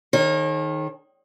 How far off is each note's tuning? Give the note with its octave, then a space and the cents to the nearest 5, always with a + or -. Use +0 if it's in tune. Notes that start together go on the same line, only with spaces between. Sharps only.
D#3 +0 G#4 +45 C#5 -40